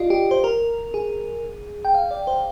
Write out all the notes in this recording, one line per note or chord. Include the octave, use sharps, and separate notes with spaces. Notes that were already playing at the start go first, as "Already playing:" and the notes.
Already playing: F4 G4 D5 D#5
G4
C5
A#4
G#4
G5
F5
D5
C5